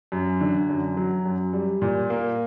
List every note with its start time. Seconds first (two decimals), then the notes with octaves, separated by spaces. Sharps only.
0.12 F#2
0.41 D3
0.69 F#2
0.97 F#3
1.26 F#2
1.53 G3
1.82 A#2
2.10 A#3